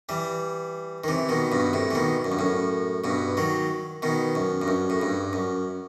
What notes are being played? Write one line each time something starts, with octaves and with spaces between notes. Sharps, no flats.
E3 G3
D#3
C3 E3
B2 D#3
G2 B2
A2 C3
E3
B2 D#3
F#2
G2
F#2 A2
G2 B2
D#3 F#3
B2 D#3
F#2
G2
F#2
A2
G2
F#2